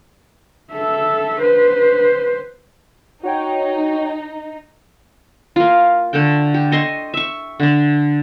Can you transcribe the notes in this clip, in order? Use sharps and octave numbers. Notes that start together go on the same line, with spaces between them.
A4 E5
B4 C5
D#4 F#4 C#5 G5
A#3 F4
D3 A3 A4 G5
G4
A4 D#5 C6 C#6
E5 C#6
D3 D4